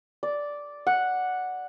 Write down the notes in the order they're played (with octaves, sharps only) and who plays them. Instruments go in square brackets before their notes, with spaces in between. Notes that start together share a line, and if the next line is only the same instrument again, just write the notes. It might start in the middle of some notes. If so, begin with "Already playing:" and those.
[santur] D5
F#5